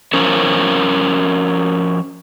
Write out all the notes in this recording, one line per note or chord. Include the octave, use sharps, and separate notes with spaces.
F3 C#4 A#4 C5 C#5